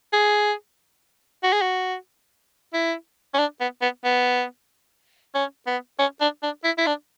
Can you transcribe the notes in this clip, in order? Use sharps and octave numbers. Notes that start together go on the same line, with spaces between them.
G#4
F#4
G#4
F#4
E4
C#4
D4
B3
B3
B3
C#4
B3
C#4
D4
D4
E4
E4
D4